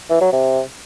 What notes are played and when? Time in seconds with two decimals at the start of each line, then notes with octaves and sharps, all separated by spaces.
0.10 E3
0.21 F#3
0.32 C3